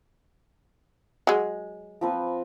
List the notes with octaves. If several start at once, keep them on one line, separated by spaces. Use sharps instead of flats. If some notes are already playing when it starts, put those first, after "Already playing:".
F#3 G#3
F3 C4 B4